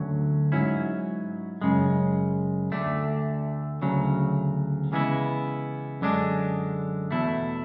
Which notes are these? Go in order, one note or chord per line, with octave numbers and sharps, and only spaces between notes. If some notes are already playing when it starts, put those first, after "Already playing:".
Already playing: D2 D3 F#3 C#4
G#2 F#3 C#4 E4
F#2 C#3 G#3
D2 D3 A3 D4
D2 C#3 F#3
C#3 E3 G#3 B3 E4
F#2 D3 G#3 D4
E2 B2 A3 E4